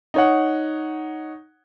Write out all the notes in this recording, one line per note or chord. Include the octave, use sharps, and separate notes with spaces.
D#4 C#5 F#5